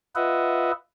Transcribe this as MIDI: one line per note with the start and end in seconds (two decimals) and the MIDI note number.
0.16 0.72 65
0.16 0.72 71
0.16 0.72 75
0.16 0.72 76
0.16 0.72 78